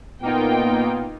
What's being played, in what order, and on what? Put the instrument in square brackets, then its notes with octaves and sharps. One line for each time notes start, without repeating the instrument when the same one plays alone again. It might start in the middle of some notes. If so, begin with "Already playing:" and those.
[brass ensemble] A#2 B3 [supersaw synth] A#3 D#4 F4 [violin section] G5